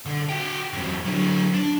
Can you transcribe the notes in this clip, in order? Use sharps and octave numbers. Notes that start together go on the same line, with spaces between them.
D3
F#4 G5
E2 F#3
D3 F#3
D4